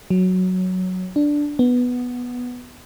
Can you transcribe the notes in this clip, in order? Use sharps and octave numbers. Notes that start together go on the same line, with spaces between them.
F#3
D4
B3